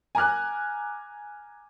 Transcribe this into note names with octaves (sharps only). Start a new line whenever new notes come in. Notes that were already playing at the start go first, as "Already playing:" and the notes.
G#5 A#5 D6 F6 F#6